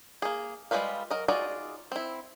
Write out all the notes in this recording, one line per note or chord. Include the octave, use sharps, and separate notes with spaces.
A#3 G#4
G3 G#3 F4 B4 F5
F#3 A#4 D#5
D#4 F4 F#4 G#4 D5
C4 E4